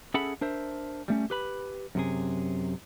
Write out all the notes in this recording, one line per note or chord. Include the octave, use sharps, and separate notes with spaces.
C#4 G#4 A4 E5 F#5 B5
D4 A#4 C5 E5
G3 A3 C#4
G4 B4 B5
F#2 C3 G#4